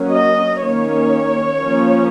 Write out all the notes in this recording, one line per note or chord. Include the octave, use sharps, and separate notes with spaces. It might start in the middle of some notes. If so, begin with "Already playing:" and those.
Already playing: F#3 A#3 C#4
D#5
D#3 A#3 C#4 C#5
F3 A#3 C#4